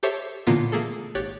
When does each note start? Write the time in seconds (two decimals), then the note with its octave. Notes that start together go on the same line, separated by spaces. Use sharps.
0.03 G4 A4 C5 C#5 E5
0.47 A#2 D3 E3 A#3 B3 F4
0.72 A3 A#3 G#4 A4
1.15 G#1 G4 C#5 F#6 A6